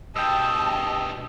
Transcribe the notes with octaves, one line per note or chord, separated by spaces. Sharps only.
G2 B2 D#5 G5 A5 E6